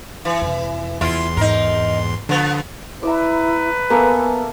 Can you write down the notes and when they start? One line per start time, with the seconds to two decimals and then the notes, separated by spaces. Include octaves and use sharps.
0.25 E3
0.41 F2 C3
1.01 E2 E4 F4 C6
1.37 G#2 D#4 A#4
2.29 D3 F3 B3
3.03 E4 B4 D5 E5 A#5
3.90 A#3 B3 A4 E5 G#5